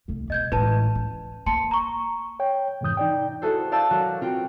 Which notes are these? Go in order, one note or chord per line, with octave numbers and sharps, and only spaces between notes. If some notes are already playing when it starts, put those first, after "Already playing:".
C2 A3
E1 D#5 G6 G#6
A1 G#3 B4 A5
C#4
A#3 A5 C6 C#7
A#5 C#6
C#5 G5
F2 G#2 C3 E3 D#6 G6
D#4 D5 G5
E4 F#4 G#4 A4 C5
D5 F5 A5 E6 G6
F#3 F#4 A#4
C4 F4 F#4 G5